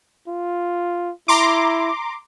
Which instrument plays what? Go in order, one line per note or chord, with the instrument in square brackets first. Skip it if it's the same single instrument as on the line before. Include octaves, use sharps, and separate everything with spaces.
[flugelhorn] F4
[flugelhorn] E4 [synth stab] A#5 C6 D6